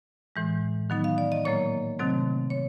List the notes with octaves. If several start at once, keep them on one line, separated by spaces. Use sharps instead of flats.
A2 E3 G#3
D#3 F#3 B3 D#4
F5
D5
D#5
A#2 F#3 A#3 C#5
C3 D#3 F#3 A3 C4
C#5